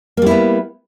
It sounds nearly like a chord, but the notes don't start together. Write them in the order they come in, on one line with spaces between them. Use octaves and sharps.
A#3 G3 E4 B3